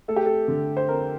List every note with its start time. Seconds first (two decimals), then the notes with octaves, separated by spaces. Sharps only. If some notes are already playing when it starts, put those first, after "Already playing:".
0.08 A3 A4
0.16 G4
0.26 A4
0.48 D3
0.77 C5
0.88 F2 A#4